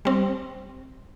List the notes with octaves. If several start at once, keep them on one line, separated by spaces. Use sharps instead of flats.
G3 C4